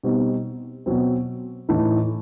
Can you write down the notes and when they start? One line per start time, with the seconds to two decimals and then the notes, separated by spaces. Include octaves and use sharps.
0.03 B2 G3 C4 D#4
0.86 B2 F#3 C4
1.69 A2 E3 A3 D#4